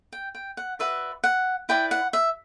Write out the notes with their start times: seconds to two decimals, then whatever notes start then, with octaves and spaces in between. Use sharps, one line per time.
0.12 G5
0.35 G5
0.57 F#5
0.79 F#4 B4 D5 E5
1.24 F#5
1.69 E4 B4 D5 G5
1.91 F#5
2.13 E5